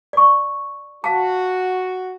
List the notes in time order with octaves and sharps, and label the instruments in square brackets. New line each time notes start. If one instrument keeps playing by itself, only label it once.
[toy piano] D5 C#6
[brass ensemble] F#4 [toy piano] F5 A5